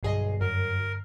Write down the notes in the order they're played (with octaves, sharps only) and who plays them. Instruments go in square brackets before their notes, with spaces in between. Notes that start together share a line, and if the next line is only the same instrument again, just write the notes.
[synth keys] B1 G#4 D#5 [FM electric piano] G2 D3 C7
[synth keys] F#2 [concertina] A#4